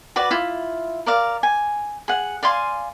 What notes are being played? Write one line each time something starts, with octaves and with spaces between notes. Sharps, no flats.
F#4 B4 D5
E4 F4
A#4 D5 F5
G#5
G#4 F#5
D5 F5 G#5 C6